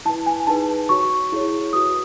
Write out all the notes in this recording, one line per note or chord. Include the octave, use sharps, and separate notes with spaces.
E4 B4 A5
G#5
D#4 G#4 B4 A5
A5
F#4 C#5 C#6
E4 G#4 C#5
F#4 B4 D#6